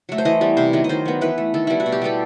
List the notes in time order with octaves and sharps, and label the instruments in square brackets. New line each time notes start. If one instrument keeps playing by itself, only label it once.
[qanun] F#3 A3
C5
E3 D#5
G3 B3
C3 C5
D#3 F#3 B3
D#5
D#3 C5
F#3 B3
E3 B4
A3
D#3 A4
G3 B3 E4
F#4
B2
G4
G3 B3 A4